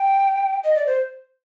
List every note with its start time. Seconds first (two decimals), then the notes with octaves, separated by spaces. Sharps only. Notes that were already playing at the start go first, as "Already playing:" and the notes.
Already playing: G5
0.64 D#5
0.75 D5
0.86 C5